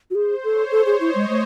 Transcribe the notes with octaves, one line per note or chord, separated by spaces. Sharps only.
F#4
G#4 C5
A4 C#5
A4 C#5
G#4
E4 D#5
G#3
A3